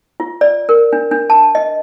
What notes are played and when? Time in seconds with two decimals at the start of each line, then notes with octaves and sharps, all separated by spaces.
0.20 F4
0.41 D5
0.69 A#4
0.93 D4
1.11 D4
1.30 A5
1.55 D#5